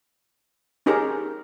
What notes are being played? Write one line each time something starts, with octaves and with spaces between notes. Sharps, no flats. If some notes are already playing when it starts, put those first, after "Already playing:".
C#4 D#4 G4 G#4 A#4